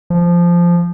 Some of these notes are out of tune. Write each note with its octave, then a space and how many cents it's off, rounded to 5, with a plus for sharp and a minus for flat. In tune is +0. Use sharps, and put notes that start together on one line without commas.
F3 -10